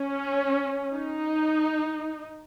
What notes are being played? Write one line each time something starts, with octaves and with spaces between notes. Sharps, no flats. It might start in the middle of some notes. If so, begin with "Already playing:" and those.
Already playing: C#4
D#4